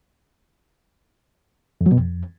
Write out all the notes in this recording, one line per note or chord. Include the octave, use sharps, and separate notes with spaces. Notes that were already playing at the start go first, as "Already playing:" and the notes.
F2
F#3
B2
F2